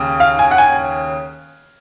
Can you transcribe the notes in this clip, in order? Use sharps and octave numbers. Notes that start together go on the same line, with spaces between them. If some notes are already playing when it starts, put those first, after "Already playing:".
Already playing: D#2 C#3
F5
G#5
F#5
G#5